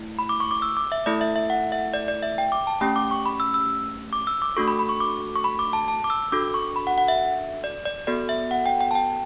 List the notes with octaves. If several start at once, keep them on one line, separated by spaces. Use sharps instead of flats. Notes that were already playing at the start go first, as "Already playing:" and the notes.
Already playing: A3 E4
B5
D6
C#6
D6
E6
D6
E5
A3 E4 A4 D5
E5
E5
F#5
E5
D5
D5
E5
G5
D6
A5
A3 C#4 G4 G5
D6
C#6
B5
E6
E6
D6
E6
D6
A3 D4 F#4 A4 C#6
B5
B5
C#6
D6
C#6
B5
D6
A5
A5
D6
E6
D4 F#4 A4 D6
C#6
B5
F#5
F#5
E5
D5
D5
B3 F#4 A4 D5
E5
F#5
G5
G5
A5
G5